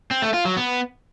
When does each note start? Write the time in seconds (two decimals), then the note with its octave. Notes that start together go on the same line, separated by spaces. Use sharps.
0.11 C4
0.22 A3
0.34 F4
0.45 F#3
0.57 B3